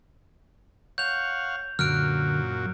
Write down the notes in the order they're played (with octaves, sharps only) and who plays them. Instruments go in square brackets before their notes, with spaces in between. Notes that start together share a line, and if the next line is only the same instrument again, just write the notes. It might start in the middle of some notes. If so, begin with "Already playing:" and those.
[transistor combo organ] C#5 F5 F#5 [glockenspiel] G6 F7
[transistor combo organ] F#2 A#2 F#3 [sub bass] D3 [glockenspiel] F6 F#6 D7